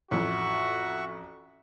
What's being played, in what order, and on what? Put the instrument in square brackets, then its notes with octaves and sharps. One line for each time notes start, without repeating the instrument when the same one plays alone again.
[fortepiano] A1 F2 [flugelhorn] F#4 [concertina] E5 F#5 C#6